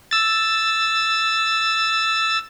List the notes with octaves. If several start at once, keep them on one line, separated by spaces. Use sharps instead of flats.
E6 A6